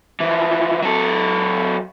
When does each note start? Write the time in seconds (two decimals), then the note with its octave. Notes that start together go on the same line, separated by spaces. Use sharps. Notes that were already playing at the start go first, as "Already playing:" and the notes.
0.20 E3 F3
0.82 F#3 A4